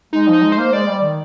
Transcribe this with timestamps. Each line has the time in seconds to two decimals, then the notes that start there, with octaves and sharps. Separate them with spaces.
0.13 G#3 D#4
0.28 F3
0.33 D#4
0.42 G#3
0.52 C5
0.58 A#3
0.73 G#3 D5
0.88 G3
1.02 D#3